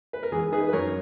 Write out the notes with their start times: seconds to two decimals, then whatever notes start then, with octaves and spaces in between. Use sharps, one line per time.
0.13 B4
0.23 A#4
0.32 E3 G#4
0.52 D#4 G#4 B4
0.68 B4
0.73 F#2 A#4 C#5